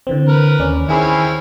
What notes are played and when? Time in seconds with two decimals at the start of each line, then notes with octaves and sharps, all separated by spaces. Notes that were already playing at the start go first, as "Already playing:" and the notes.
0.07 D3 E3 C4
0.28 A#4 B4
0.59 D#2 C#4 D5
0.89 D#3 C4 C#4 E4 G#4 B5